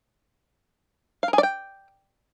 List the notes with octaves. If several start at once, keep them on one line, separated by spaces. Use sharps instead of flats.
F5
A#4
G#4
D5
G5